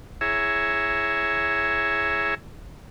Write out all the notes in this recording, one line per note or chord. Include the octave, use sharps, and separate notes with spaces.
E4 G#4 C#5 E5 G#5 A#5